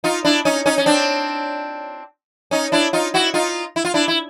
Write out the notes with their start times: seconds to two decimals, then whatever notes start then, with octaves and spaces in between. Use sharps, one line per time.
0.04 D#4 F4
0.25 D4 E4
0.45 C#4 D#4
0.66 C#4 D#4
0.78 C#4
0.86 C4 D4
2.51 C#4 D#4
2.72 D4 E4
2.93 D#4 F4
3.14 E4 F#4
3.34 D#4 F4
3.76 E4
3.85 F4
3.94 D4 E4
4.08 E4